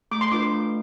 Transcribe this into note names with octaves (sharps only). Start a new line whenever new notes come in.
A3 D6
C6
D4 F4 B4 D6
A3